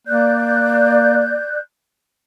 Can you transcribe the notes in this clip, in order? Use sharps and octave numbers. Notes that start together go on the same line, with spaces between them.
A#3 D5 F#6 G6